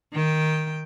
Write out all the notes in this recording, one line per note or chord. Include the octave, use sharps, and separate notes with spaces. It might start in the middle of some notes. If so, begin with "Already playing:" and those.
D#3 G5